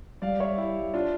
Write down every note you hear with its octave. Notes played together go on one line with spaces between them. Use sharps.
G3 D5 F5
C#5 E5
E4 G4
D4 F4